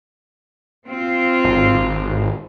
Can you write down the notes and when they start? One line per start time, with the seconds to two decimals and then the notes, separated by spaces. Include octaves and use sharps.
0.88 C4 F4
1.44 G#1
1.74 G#1